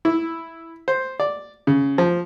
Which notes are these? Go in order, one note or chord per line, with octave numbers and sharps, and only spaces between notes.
E4
C5
D5
C#3
F3